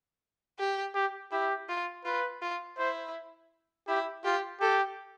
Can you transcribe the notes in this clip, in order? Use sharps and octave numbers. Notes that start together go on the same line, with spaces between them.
G4
G4
E4 G4
F4
F4 B4
F4
E4 C5
E4 G4
F4 G4
G4 A4